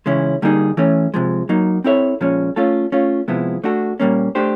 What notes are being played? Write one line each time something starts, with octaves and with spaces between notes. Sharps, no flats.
C#3 E3 G#3 C#4 E4
D3 G3 A#3 D#4 G#4
E3 A3 C#4
C3 F3 G#3
F#3 A#3 D#4
C4 E4 A4 C#5 E5
A#2 F3 G#3 C#4
A3 C#4 F4 A4
A3 C#4 F4
C3 F3 G#3 B3 E4
A3 D4 F#4 A4
A#2 G3 A#3 C#4
A3 D4 G4 C5